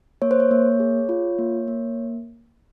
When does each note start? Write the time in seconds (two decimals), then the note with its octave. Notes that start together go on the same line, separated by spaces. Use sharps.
0.22 A#3 C#5
0.31 C5
0.40 C#5
0.51 A#3
0.80 G#4
1.09 F4
1.39 A#3
1.68 A#3